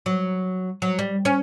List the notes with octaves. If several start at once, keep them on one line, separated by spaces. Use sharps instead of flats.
F#3
F#3
G3
C#4